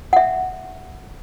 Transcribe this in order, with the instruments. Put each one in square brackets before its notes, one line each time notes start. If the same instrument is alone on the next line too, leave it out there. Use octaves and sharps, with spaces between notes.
[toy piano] E5 F#5